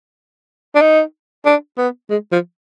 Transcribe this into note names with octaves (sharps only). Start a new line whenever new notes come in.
D4
D#4
D4
B3
G#3
F3